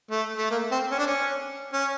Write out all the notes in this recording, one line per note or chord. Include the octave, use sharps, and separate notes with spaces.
A3
A3
A#3
C4
C#4
D4
C#4
C#4